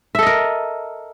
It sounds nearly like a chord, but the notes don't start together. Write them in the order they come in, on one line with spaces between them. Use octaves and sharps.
E5 A4 D#5 A#4